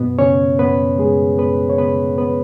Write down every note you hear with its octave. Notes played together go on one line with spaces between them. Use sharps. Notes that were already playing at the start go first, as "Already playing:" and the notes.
Already playing: F#2 B2 B3
C#3 C#4 C#5
F#2 B3 B4
C#3 G#3 G#4
F#2 B3 B4
C#5
C#3 B3 B4
B3 B4